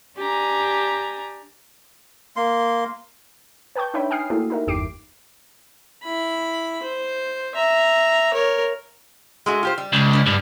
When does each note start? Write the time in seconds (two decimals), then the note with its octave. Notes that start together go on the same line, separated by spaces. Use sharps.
0.17 D4 G4 G#5 A#5
2.36 A#3 C6
3.76 B4 G5 A5 C#6 G6
3.94 D4 D#4 C#5 E5 G5 B5
4.11 G5 G#5 D#6 F6 C7
4.30 A3 A#3 E4 F#4 G4 A4
4.50 D#4 A#4 E5
4.67 G1 E2 G4 D6 C7 D7
6.03 E4 B5
6.82 C5
7.55 E5 A#5
8.34 A#4 C#5
9.46 G#3 A3 F#4
9.63 F4 G4 C5
9.78 G3
9.93 C#2
10.13 C#4 D5
10.27 G2